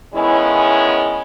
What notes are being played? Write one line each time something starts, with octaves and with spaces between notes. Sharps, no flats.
D#3 G#3 B3 C#4 E4